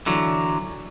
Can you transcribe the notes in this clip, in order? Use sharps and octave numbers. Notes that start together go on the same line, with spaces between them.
D3 E3 F#3